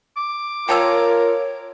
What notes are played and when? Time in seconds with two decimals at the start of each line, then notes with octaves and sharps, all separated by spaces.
0.17 D6
0.69 F4 A#4 C#5 G5 A5 E6